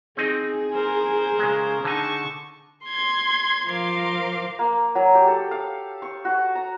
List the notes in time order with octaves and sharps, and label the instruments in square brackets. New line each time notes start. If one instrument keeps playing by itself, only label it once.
[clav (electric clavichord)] C4 D#4 [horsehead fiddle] G#4
[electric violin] A#4 C5
[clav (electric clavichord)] C#3 G#3
[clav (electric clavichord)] D3 D#4 [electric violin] A5 C#6
[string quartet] C6 G#6
F3 A#4 C5 F5 C6 D6
[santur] A#3
F#3
G4
A4
F5
C#6
F#4
A#5